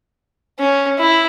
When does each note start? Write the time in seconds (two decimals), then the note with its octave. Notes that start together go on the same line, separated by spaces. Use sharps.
0.59 C#4
0.99 E4